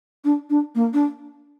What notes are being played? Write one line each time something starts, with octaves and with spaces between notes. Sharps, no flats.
D4
D4
A#3
D4